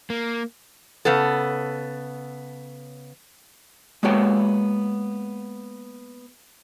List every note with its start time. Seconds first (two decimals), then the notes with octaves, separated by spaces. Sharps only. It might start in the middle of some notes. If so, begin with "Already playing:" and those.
0.10 A#3
1.05 C#3 B3 A4
4.03 G#3 A#3 B3 F#4 C#5 G5